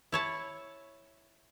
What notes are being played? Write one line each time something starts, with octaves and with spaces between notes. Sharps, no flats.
E4 C#5 A5